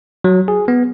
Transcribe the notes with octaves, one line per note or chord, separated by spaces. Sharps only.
F#3
G#4
B3